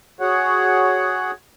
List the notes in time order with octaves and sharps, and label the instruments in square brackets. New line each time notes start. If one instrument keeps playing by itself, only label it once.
[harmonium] F#4 G#4 C#5 F#5